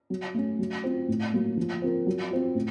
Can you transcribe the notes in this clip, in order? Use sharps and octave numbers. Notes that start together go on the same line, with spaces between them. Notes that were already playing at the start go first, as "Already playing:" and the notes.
F#3
A3 C#4
F#3
C4 F4
A2
F#3 A#3
F3
C4 F4 A#4
F#3
C4 F4
A2